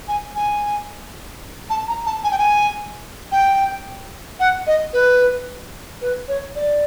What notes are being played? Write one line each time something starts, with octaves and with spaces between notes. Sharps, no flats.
G#5
G#5
A5
A#5
A5
G#5
G5
G#5
G5
F#5
D#5
B4
B4
C#5
D5